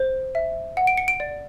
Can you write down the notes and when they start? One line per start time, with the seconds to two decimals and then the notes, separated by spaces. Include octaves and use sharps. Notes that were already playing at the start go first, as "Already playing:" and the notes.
Already playing: C5
0.35 E5
0.77 F#5
0.87 D7
0.98 C#7
1.08 D7
1.20 D5